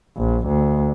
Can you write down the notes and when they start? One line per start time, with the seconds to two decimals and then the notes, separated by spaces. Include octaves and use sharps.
0.17 A#1
0.47 D2